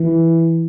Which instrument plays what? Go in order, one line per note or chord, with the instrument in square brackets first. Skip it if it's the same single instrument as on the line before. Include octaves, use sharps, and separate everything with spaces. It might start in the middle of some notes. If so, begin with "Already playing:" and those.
Already playing: [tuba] E3